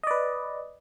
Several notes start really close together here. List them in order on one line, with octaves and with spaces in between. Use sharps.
D#5 D5 B4